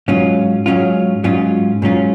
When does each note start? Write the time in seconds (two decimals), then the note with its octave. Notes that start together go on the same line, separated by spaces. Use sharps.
0.08 G#2 F#3 C#4 F4
0.66 G#2 F#3 C#4 F4
1.24 G#2 F#3 C#4 F4
1.82 G#2 F#3 C#4 F4